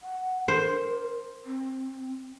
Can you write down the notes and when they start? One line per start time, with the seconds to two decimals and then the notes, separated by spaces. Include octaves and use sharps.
0.01 F#5
0.48 A#4 C5
1.46 C4